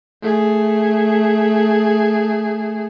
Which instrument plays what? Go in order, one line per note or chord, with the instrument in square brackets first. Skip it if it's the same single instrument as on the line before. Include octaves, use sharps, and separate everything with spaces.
[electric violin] A3 G#4